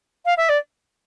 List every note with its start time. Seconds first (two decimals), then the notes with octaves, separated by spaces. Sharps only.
0.25 F5
0.37 E5
0.49 D5